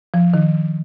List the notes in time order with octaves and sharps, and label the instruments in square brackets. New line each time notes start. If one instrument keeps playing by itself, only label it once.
[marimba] F3
D#3